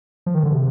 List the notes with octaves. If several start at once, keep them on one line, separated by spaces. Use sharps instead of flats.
F3
D#3
D3
C3